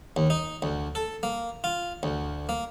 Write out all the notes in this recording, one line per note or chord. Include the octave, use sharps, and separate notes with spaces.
D#2
D#4
D2
A4
A#3
F4
D2
A#3